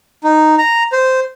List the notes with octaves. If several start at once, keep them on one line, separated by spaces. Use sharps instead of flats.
D#4
A#5
C5